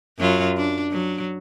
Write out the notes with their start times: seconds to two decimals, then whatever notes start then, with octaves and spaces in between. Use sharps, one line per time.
0.19 F#2 F#3 F4
0.57 D4
0.91 F#3